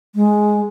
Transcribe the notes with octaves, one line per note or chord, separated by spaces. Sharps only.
G#3